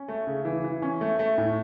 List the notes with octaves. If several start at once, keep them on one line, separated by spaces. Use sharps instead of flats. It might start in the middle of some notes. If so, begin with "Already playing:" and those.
Already playing: C#4
A3
C#3
E3
E3
C#4
A3
A3
A2